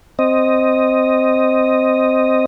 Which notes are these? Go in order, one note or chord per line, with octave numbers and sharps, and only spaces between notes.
C4 D#5